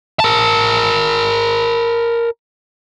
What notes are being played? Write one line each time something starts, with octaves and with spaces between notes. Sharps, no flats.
A#4 A5